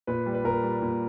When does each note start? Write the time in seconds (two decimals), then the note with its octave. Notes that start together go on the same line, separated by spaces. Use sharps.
0.07 A#2 B4
0.26 G3
0.34 B4
0.44 A#2 A#4
0.63 G3
0.82 A#2